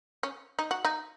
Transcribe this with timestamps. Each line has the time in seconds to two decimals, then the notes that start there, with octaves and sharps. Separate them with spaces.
0.23 C#4
0.59 D#4
0.71 F#4
0.85 D#4